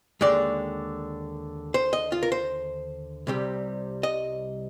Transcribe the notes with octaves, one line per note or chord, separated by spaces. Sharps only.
D#2 D3 G#3 D5
C5
D#5
F4
A#4
C5
C2 C3 G3
D#5